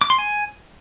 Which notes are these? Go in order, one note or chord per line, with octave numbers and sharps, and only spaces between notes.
D6
C6
G#5